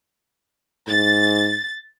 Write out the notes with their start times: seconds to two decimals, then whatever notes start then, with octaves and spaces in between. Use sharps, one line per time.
0.88 G#2 A6